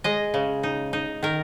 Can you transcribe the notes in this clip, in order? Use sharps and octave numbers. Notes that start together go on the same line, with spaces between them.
G#3 D#5
C#3
D#4
D#4
D#3 A#4